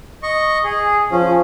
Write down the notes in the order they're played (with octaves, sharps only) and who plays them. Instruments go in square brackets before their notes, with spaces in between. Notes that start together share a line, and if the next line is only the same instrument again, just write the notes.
[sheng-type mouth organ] D#5 C#6
G#4
[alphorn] F3 [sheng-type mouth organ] C#4